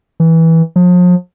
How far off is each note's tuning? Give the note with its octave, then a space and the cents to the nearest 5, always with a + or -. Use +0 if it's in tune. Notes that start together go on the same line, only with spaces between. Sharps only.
E3 -15
F3 +40